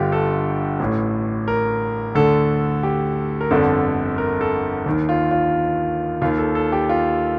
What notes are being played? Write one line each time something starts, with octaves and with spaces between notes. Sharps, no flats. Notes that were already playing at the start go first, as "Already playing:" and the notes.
Already playing: G1 G2 D3 F4 G4
A4
A1 A2
A#4
D2 D3 A4
G4
A#4
G1 F2 D3 A4
A#4
A4
D#2 D#3
F4
F4
D#2 D#3 F4
A4
A4
G4
F4